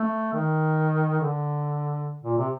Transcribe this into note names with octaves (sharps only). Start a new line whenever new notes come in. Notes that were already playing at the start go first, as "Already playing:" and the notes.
Already playing: A3
D#3
D3
A#2
C3